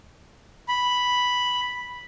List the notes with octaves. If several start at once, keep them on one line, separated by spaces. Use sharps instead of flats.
B5